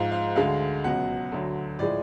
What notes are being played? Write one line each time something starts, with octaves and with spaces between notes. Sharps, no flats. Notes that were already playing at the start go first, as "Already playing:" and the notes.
Already playing: G#2 F3 G#3 F5
F5
D2 D3 G#3 F5
C#2 B2 F#3 F#5
D2 D3 F#3
A2 F3 G#3 D5